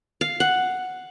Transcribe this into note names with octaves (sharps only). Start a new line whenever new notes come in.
F5
F#5